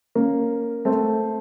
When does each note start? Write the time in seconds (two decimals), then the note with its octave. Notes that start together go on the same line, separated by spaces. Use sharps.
0.15 A#3 C#4
0.85 A3 C4